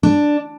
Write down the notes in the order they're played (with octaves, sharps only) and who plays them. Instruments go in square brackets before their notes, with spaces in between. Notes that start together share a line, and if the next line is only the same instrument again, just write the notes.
[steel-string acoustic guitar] D4